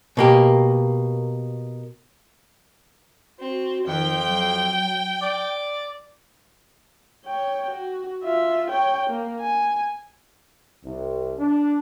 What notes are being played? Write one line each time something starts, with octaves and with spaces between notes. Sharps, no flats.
B2 A#3 G4
C4 F#4
F2 D#3 G5
F#3
D5
C#5 G5
F#4
F4 E5
C#5 G5
A#3
G#5
C2
D4